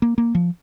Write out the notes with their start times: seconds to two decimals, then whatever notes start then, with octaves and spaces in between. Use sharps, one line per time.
0.02 A#3
0.18 A#3
0.35 F3